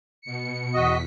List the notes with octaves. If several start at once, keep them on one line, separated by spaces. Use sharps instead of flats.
B2 C#7
E2 F#4 D#5 B6